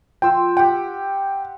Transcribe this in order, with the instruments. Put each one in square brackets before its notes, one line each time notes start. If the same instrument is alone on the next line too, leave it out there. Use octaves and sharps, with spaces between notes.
[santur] F3 F4 E6 [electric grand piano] G5 C6
[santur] G4 F#5 [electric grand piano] G5